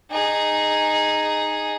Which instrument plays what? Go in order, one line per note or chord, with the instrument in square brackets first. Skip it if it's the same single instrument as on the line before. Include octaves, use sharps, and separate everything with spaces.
[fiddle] D#4 G#4